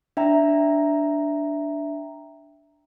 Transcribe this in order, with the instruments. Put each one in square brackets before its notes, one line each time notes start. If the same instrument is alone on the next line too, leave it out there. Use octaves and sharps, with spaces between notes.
[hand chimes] D4 E5 G5 A#5